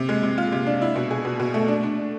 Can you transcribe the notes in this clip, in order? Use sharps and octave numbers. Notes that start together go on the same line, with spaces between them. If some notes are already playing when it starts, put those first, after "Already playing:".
Already playing: C3
G#3
C3
F4
C3
D4
E4
B2
G#4
B2
B2
A3
D4
D4